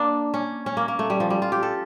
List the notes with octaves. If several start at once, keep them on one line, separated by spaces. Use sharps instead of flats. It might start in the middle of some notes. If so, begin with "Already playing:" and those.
Already playing: A#3 D4
C#4
C#4
A#3
A#3
A3
G3
F3
G3
F4
G4
A4